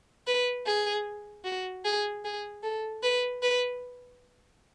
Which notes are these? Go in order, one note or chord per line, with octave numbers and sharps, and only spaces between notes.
B4
G#4
F#4
G#4
G#4
A4
B4
B4